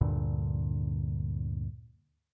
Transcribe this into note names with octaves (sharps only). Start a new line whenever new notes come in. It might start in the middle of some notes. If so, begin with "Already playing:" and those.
D2 G2 A#2 D3